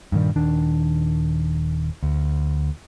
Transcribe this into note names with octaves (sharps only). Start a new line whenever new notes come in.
G2 A#2 D#3 G3
D#1 D#3 D4
D2